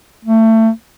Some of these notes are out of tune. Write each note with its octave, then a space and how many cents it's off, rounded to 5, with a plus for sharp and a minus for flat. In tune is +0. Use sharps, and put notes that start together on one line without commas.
A3 +25